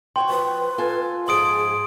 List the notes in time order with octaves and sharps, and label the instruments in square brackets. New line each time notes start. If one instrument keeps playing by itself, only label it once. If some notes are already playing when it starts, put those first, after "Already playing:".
[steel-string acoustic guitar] F#4 C#5 G5 [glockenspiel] C6
[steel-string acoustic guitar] F3 [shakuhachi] B4
[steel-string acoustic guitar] F4 A4 G#5
[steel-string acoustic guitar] G#2 F3 [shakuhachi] G#4 [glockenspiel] C6 D#6 D7